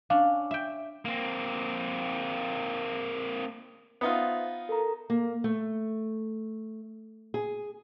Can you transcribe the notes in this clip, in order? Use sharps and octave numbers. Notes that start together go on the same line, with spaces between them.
C#4 D4 F5
E5 G5
A#3 C4
B3 D#4 F4 C5 E5
A4 A#4 A#5
A#3
A3
G#4